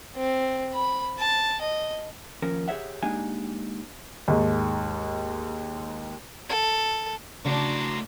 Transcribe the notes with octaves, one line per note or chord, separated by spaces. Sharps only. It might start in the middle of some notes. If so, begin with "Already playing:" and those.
C4
B5
A5
D#5
D#2 F3 C#4 A#4
G4 G#4 C5 C#5 E5 F#5
G#3 A#3 D4 D#4 G4 G#5
D#2 G#2
A4
A2 C#3 D4 F#4 A#5 C6